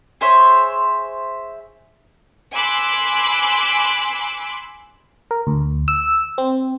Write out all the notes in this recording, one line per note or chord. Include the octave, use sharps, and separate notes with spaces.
G#4 C5 C#5 E5
G#5 B5 C6 D6 E6 F#6
A#4
D2
E6
C4